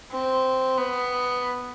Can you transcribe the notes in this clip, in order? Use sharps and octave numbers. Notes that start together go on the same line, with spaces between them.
C4
B3